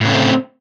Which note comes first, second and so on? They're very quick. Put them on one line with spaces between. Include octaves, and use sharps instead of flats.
A2 C#3 A3 C4